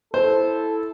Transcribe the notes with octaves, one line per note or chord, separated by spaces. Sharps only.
E4 A4 C5